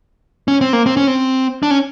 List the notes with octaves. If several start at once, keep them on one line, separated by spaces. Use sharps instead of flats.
C#4
C4
A#3
C4
C#4
C4
D4
C#4